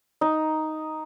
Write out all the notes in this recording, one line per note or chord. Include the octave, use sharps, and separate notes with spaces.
D#4